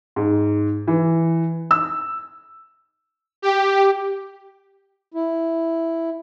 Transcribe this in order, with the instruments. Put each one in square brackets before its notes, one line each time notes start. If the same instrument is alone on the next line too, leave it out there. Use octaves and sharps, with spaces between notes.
[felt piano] G#2
E3
E6
[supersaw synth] G4
[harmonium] E4